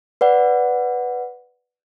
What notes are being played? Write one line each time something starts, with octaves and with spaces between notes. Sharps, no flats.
B4 D5 F#5